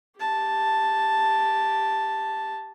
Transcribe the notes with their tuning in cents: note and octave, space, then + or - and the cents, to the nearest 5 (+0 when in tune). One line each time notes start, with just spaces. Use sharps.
G4 +0 A5 +0